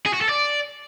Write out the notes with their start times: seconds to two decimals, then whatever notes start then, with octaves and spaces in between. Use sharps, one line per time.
0.06 G#4
0.14 F#4
0.21 A4
0.29 D5